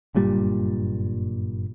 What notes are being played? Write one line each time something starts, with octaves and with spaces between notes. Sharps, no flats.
F#1 G2 A#2 G3